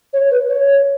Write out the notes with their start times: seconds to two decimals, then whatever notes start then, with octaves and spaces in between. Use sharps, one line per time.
0.13 C#5
0.31 B4
0.49 C#5